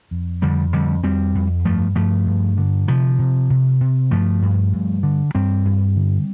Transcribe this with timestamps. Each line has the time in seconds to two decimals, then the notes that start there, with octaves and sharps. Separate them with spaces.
0.11 F2
0.42 F2 D3 G3
0.72 F2 D3 G3
1.03 F2 G3 C4
1.35 F2
1.65 G2 F3 A3
1.96 G2 F3 A3
2.26 G2
2.58 D3
2.88 C3 F3
3.19 C3
3.50 C3
3.81 C3
4.11 G2 F3 A3
4.42 G2
4.73 G2
5.03 D3
5.35 G2 G3 C4
5.65 G2
5.96 D3